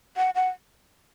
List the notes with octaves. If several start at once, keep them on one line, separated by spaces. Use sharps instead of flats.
F#5
F#5